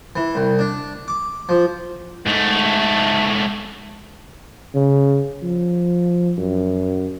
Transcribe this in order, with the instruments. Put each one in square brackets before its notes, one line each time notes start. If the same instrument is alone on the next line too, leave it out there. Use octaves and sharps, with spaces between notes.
[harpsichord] E3
C2
D4
D6
F3
[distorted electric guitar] G#2 A3
[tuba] C#3
F3
F#2